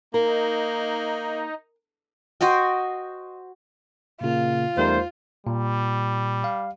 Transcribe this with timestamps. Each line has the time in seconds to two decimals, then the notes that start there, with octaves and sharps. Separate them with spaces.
0.14 A#3 D#4 A#4
2.41 F#4 C5 D#5 G5
4.21 A#2 C#3 A#3 F4
4.77 E2 G3 A3 D#4 A#4 C5
5.47 A#2 G3
6.44 F5